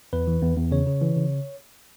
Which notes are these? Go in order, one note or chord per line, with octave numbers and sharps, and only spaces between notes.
E2 B4
E3
E2
E2
C#3 C#5
C#3
E3
C#3